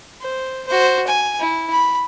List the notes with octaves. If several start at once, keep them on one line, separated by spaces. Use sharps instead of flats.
C5
F#4 C5
G#5
E4
B5